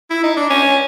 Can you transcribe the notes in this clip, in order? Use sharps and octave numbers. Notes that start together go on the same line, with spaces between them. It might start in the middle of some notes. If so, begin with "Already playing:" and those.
E4
D#4
D4
C#4